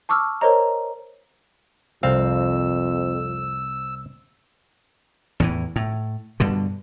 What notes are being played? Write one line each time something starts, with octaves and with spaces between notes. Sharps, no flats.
A5 C#6 D6 E6 F6
A#4 C5 C#5 D#5 A#5
C2 F2 C4 F5 E6
E2 A2 E3
A2
G2 B2 D3